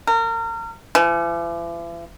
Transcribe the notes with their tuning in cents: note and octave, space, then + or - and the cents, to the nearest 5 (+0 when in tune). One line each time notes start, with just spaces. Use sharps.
A#4 -30
E3 +45